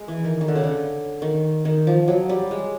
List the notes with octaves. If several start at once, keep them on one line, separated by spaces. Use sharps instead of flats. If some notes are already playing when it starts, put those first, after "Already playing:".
Already playing: G#3
E3
D#3
D#3
D3
C#3
D3
D#3
D#3
F3
F#3
G3
G#3